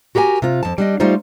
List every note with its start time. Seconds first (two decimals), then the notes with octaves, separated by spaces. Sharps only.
0.15 F#4 G4 A#4 F5 G#5
0.42 C3 F4
0.63 F2 A5
0.78 G3 D4 D#5
1.00 G3 A3 D#4 F4 C5